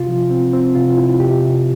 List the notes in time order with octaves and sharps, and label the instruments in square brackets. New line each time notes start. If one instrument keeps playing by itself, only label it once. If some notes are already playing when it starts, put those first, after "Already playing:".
Already playing: [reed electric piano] C3 F4
F3
C4
C4
C3 F4
E4
C3 G4
C3